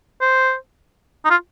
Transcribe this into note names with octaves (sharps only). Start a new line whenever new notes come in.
C5
D#4
F4